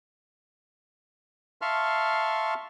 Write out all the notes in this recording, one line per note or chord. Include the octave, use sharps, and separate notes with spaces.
E5 F5 A5 C6 C#6 F6